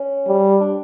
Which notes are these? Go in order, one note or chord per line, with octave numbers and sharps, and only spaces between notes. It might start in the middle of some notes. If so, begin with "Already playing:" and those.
Already playing: C#4
G3
D4